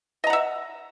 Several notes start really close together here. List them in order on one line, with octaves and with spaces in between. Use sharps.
D#5 A#5 F#5 E5